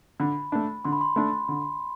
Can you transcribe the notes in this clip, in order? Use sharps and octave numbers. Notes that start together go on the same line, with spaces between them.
D3 B5
A3 D4
D3 C6
B5
C6
A3 D4
D3